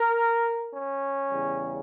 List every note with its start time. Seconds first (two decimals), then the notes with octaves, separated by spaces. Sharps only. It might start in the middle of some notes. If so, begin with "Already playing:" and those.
Already playing: A#4
0.72 C#4
1.31 E2 C#3 G3